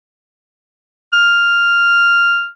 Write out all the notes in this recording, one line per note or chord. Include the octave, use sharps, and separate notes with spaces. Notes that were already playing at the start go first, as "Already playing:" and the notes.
F6